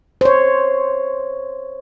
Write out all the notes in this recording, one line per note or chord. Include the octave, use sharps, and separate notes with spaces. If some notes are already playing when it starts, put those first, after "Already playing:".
C5 C#5